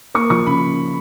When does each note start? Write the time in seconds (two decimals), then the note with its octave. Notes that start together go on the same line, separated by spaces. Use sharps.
0.15 A#3 C#6
0.30 F3 C#6
0.46 C#3 B5